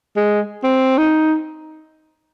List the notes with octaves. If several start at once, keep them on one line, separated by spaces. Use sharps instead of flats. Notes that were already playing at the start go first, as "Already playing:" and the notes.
G#3
C4
D#4